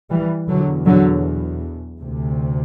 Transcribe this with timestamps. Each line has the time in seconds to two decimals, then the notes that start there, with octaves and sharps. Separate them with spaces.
0.10 E3 G3
0.48 E2 B2 D3 F#3
0.86 D3 F#3
2.00 D2 C3